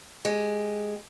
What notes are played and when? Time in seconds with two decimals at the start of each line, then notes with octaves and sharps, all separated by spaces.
0.25 G#3 G4